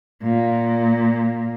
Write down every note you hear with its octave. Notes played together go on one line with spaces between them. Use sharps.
A#2